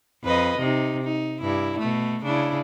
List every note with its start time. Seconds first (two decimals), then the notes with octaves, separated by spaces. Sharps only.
0.23 F2 B4 D#5
0.58 C3 D#4
1.03 D#4
1.41 G2 E4
1.79 B2 A3
2.23 C#3 D4 E4